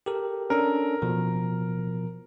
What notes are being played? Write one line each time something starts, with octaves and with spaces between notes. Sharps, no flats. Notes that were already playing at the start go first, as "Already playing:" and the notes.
G4 A4 A#4
C#4 D4 A4 A#4
B2 F3